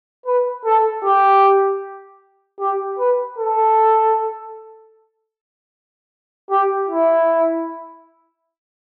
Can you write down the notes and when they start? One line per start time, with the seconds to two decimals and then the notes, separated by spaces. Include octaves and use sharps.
0.26 B4
0.65 A4
1.04 G4
2.60 G4
2.99 B4
3.38 A4
6.50 G4
6.89 E4